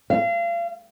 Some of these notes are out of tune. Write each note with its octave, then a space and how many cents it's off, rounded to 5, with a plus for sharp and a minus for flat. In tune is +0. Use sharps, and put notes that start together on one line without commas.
F5 -35